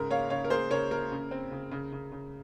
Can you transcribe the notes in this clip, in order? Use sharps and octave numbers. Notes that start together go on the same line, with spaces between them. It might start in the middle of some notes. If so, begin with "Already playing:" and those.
Already playing: G#2 C#3 A#4
A#3 C#5 F5
C#3 C#5 F5
A#4
A#3 G#4 C5
C#3 A#4 C#5
A#3 A#4
C#3
C4
C#3
C#3
C#3
C#3